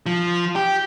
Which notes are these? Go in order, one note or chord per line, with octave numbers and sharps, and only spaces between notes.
F3
G4